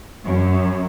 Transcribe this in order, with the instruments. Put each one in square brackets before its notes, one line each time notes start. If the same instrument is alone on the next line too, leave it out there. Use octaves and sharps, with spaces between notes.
[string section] F#2